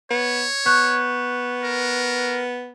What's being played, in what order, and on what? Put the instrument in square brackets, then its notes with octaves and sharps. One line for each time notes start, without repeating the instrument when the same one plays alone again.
[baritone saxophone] B3 [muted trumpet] C#5
[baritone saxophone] B3 [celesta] C#6 F#6 G6
[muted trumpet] A#4